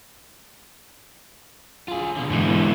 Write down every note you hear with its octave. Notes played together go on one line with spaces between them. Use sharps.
F4 G#4
B2 D3
G#2 E3